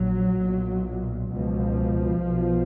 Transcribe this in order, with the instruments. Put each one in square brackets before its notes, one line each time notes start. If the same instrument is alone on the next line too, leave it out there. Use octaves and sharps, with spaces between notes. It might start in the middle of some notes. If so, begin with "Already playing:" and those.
Already playing: [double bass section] A#1 A#2 F#3
B1 A#2
C#2 B2 F3
B1 B2